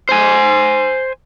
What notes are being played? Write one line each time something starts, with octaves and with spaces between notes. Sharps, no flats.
C5 G#5